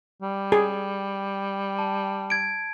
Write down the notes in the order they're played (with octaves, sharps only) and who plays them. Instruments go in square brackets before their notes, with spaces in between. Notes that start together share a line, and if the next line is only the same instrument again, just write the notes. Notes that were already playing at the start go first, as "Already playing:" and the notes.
[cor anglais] G3
[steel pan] G#4
[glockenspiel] A5
G#6 D7